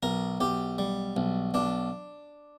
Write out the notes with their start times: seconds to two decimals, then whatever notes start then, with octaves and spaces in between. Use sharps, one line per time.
0.03 B1 A#4
0.40 B1 G4
0.78 G3
1.17 B1
1.54 B1 D4